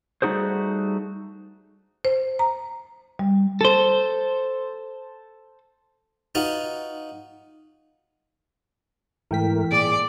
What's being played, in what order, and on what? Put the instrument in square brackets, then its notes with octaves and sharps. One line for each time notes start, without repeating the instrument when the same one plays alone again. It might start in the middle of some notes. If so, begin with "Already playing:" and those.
[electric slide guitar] G3 A3 D#4 F#4 G#4 C5
[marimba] C5
A#5
G3
[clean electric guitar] A4 C5
[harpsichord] D#4 F4 F#4 B4
[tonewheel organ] G#2 A3 A#4 [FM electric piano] E3 G5 B6
[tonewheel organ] A#2 G#4 [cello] D5